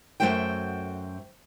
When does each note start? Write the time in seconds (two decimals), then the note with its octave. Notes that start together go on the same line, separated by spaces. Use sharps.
0.20 F#2 E3 A3 F#4 C5 G5